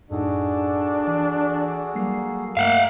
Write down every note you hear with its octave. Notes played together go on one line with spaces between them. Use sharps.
F#2 A2 D4 D#4 F#4 G#4 A4
E3 D5
F#3 G3 A#3 C7
G2 A3 A#3 F5 F#5